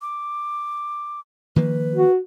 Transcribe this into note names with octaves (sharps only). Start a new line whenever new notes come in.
D6
D#3 F3 A#3 B4
F#4